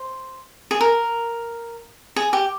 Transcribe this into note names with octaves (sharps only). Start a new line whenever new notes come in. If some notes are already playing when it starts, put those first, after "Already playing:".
Already playing: C5
G#4
A#4
G#4
G4